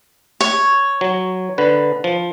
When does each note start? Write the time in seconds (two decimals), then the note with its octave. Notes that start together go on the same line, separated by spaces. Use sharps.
0.41 C#5
1.01 F#3
1.58 D3 B4
2.04 F3